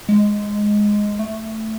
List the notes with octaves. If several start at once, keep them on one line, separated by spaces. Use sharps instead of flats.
G#3
A3